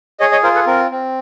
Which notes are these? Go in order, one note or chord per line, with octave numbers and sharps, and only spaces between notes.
G#4 C#5 D#5
C#5 D#5
F4 A#4 C5
A4 B4
C4 A#4
C4